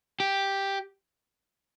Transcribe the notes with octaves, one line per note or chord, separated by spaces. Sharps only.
G4